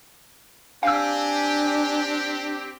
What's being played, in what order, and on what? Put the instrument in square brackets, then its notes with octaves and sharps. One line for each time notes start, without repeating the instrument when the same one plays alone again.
[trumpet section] C4 G4 [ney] D4 [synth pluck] F5 E6 [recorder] G#5